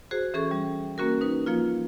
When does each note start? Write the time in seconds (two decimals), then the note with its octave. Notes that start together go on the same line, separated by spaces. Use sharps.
0.11 F#4 G#4 C5
0.34 E3 C#4 G#4 A4 C#6
0.51 G3
0.98 A#3 C#4 F#4 A#4
1.21 D#4 B4
1.46 F3 A#3 F4